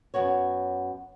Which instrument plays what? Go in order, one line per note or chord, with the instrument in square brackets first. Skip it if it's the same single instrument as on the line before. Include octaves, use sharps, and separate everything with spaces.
[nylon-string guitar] F#2 B3 F#4 C#5